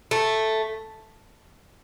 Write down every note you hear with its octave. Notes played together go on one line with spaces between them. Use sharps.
A3